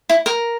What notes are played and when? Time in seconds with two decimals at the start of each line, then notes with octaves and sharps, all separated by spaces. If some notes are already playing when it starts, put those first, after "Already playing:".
0.09 E4
0.26 A#4